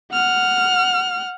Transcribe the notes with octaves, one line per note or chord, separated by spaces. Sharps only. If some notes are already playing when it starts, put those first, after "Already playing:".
F#5 F6